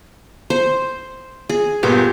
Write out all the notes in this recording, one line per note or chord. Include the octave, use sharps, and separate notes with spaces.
C5
G#4
G1 A#2 B3 G4